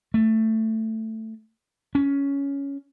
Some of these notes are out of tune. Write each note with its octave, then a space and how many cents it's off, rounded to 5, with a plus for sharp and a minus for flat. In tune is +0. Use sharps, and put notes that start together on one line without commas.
A3 +10
C#4 +10